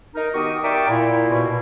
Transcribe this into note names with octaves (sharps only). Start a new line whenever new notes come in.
D#4 A#4
D#3 B3 F#4 G4 C#6 D#6
A#4 D5 E5 G5 C#6 D6
A#2 E4
B2